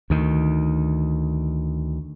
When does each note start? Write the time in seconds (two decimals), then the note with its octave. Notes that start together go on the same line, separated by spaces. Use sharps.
0.10 D2 D#3